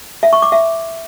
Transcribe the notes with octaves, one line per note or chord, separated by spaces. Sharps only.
E5
C#6
D6
E5